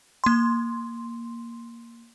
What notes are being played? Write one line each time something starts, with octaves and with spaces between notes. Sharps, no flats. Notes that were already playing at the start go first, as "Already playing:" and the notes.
A#3 C6